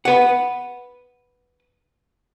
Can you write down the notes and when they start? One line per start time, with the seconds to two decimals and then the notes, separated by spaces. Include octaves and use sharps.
0.05 B4 F#5